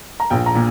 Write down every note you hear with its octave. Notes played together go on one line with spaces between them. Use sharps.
A#5
A#1 G5
A#5
A#2